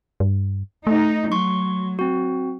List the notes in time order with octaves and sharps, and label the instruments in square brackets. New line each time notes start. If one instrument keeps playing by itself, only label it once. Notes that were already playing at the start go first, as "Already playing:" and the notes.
[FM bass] G2
[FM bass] A3 [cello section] D#4
[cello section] F#3 [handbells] C6 C#6
[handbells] C4 F#4